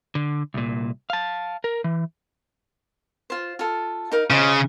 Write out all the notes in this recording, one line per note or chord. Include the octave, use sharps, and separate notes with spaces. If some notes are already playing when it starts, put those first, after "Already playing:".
D3
C2 A#2
F5 A5
A#4
E3
F4 C5
F4 A4
D#4 A#4 F5
C#3 F4 C5 D#5